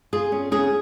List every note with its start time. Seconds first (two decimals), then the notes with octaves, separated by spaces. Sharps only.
0.13 F4 G#4
0.32 C#4
0.51 C#4 G#4